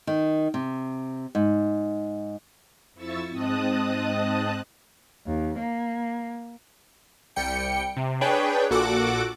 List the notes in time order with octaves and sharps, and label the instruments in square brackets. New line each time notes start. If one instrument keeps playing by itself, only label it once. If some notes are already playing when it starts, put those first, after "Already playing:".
[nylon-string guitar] D#3
C3
G#2
[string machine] F2 F3 E4 C#6 E6 A6
G#2 C4 D#5 A5 D#6 F#6
[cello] D#2
A#3
[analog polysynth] C2 G3 G5 C#7
C3
D4 G#4 B4 C#5 G5
A#1 A#2 F#4 A4 F#5 D6